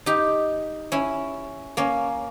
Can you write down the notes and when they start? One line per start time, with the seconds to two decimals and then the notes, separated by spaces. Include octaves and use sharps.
0.06 D#4 G4
0.92 C#4 E4
1.77 A#3 C#4